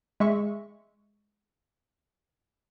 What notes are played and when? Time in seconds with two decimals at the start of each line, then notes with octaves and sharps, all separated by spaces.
0.20 G#3 E5 C#6